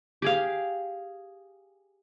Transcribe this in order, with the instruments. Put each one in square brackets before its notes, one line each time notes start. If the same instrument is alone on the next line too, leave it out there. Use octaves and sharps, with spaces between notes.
[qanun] G4 G#4 F5